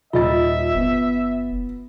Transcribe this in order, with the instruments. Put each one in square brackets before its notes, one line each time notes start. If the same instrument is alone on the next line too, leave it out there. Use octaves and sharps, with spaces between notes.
[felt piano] D#1 D#5 A6 [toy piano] F4 [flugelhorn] E5
[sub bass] F#1 [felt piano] B3